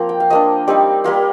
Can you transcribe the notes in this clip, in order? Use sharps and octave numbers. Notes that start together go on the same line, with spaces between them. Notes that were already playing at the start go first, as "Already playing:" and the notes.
Already playing: F3 A#3 C4 F4
G5
F5
F3 A#3 D4 D#5
G3 C4 D#4 D5
G3 A#3 F4